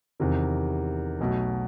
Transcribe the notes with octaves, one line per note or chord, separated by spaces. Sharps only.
E2 C3 D#3
B1 B2 A3